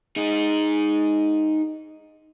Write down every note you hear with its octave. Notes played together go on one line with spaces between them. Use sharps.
D#4 G#4